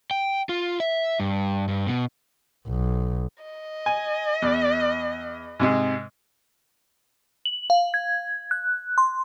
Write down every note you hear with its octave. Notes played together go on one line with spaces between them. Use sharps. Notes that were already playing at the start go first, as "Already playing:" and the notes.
G5
F4
E5
G2
G2
B2
B1
D#5
G#5
E2
G#2 C3 G#3
F#7
F5
G#6
F#6
C6